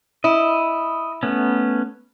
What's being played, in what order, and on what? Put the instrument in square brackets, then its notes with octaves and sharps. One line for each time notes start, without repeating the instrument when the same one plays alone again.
[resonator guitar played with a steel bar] E4 [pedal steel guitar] D#5
[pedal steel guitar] A3 B3 C#4